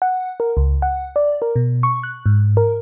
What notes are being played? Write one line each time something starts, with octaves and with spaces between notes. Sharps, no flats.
F#5
A#4
C#2
F#5
D5
A#4
B2
C#6
F#6
G#2
A#4